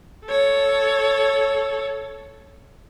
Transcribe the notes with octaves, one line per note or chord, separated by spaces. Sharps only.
A4 C#5